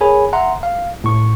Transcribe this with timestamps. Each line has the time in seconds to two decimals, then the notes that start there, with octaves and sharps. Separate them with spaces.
0.01 G#4 A#4 C#5 G#5 B5
0.33 E5 F#5 A#5 C6
0.63 F5
1.04 A2 C#6